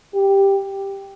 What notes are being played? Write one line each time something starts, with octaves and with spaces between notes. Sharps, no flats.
G4